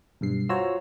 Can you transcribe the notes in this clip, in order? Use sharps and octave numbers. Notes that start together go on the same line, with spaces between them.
B1 G2 C7
F4 F#4 C5 C#5 A#5 E6